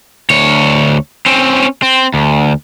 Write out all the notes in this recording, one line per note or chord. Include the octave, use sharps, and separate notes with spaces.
D2 C#5
C4 C#4
C4
D2